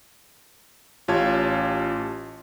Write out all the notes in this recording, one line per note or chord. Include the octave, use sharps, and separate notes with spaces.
A1 F4 G4 C#5 A5 G#6